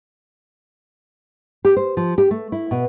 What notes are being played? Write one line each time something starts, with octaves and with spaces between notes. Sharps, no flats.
G4
C5
F3
G4
A3
E4
B2